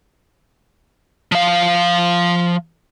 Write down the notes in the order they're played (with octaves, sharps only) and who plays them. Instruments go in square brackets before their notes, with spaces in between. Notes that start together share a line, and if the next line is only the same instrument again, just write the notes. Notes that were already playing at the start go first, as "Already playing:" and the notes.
[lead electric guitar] F3 F5